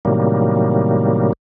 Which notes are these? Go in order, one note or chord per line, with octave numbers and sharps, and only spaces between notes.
A2 C3 D#3 F#3 G3 A#3